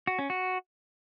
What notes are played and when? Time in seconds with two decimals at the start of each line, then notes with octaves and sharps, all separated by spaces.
0.07 F#4
0.19 C#4
0.30 F#4